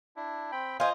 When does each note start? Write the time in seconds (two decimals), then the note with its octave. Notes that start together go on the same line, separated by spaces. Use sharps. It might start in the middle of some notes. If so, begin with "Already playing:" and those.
0.16 D4 E4
0.52 C4 G5 B5
0.80 F4 C5 D#5 G#5